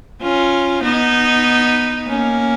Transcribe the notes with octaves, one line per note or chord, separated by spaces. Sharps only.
C#4 F4
B3 D#4
A#3 C#4